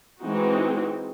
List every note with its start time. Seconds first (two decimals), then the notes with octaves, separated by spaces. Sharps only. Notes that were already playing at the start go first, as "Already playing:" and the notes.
0.21 E3 G#3 C4 D#4 F#4